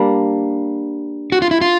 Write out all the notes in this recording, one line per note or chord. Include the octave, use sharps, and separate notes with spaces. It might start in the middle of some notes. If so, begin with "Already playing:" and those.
Already playing: G3 A#3 D4
F#4
F4
E4
F4